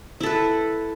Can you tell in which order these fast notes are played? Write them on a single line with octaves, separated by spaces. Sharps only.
E4 A4 B4